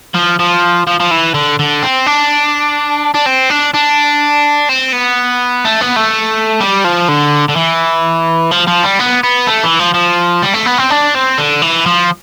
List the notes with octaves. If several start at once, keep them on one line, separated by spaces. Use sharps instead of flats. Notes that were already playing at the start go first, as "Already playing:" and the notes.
F3
F3
F3
F3
E3
D3
D3
C4
D4
D4
C4
D4
D4
C4
B3
A3
B3
A3
G3
F3
D3
D3
E3
F3
F3
G3
B3
B3
A3
E3
F3
F3
G3
A3
B3
C4
D4
C4
D3
E3
F3